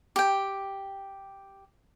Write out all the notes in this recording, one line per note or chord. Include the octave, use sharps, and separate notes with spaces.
G4 G5